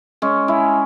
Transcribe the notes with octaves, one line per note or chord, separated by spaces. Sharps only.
G#3 C#4
G#3 E4